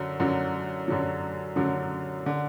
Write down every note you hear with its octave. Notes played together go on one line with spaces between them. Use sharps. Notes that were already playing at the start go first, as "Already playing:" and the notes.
Already playing: F#2 D3 F#3
F#2 D3 F#3
F#2 D3 F#3
F#2 D3 F#3
D3